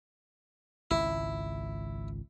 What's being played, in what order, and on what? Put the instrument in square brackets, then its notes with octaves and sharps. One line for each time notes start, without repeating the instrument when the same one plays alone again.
[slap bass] G#1 C#2 [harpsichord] E4